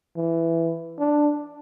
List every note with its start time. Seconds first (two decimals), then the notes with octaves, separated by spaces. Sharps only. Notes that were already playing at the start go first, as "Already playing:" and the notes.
0.17 E3
0.99 D4